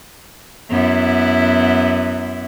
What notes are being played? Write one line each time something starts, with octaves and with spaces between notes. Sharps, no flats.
F#2 B3 E4